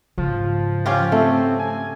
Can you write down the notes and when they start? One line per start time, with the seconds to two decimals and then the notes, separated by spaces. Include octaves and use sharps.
0.18 G#2 C#3 F3
0.86 C#4 F4 G4
1.12 A3 C4
1.59 G#5